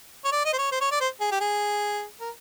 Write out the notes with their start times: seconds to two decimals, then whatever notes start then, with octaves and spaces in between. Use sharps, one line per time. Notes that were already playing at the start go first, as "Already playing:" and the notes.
0.25 C#5
0.32 D5
0.45 D#5
0.53 C5
0.58 C#5
0.72 C5
0.81 C#5
0.92 D5
1.01 C5
1.21 G#4
1.31 G4
1.41 G#4
2.21 A#4